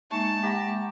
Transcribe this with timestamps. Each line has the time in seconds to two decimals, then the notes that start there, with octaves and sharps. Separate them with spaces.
0.11 G#3 A#3 D#4 E5 A5 C#6
0.43 G4 F#5 A#5 B5